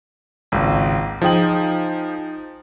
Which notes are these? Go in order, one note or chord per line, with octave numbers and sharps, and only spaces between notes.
G#1 C#2
F3 D#4 G#4 G5 F#7